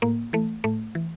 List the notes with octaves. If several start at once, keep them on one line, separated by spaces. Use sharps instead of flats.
A2 A#3
E3 A3
A2 A3
E3